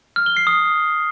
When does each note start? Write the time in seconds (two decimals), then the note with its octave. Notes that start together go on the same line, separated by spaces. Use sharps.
0.16 F6
0.26 G7
0.37 C7
0.47 D#6